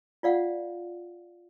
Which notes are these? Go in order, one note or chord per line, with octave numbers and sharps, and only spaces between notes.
F4 D5 F5 F#5